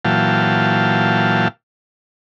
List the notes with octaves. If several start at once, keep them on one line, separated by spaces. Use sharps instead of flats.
A#2 E3 F#3 F5 G5 A5